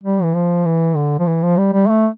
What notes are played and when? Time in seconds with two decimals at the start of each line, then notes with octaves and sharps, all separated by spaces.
0.04 G3
0.23 E3
0.34 F3
0.65 E3
0.96 D3
1.19 F3
1.27 E3
1.42 F3
1.57 G3
1.73 G3
1.88 A3